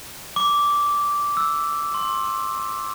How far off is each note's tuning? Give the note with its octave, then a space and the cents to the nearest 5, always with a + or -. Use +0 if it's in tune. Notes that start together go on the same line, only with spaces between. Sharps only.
D6 -10
E6 +0
C6 +25